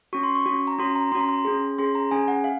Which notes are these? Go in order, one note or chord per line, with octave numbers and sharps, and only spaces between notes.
C#4 F#4 C#6
C6
C#6
C#4 F#4
A#5
C#4 F#4 C6
A#5
C#4 F#4 C6
A#5
C6
C#4 G#4
C#4 G#4 C6
A#5
C#4 G#4 G#5
F#5
F5